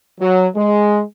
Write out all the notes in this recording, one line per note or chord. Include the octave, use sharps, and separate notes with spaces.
F#3
G#3